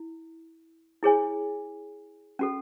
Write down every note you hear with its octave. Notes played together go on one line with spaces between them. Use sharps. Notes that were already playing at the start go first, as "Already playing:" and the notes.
Already playing: E4
E4 G#4 C#5 G#5
C#4 F#4 A4